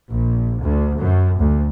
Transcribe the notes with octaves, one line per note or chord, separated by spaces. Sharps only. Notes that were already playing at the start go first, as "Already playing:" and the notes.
A#1
D2
F#2
D2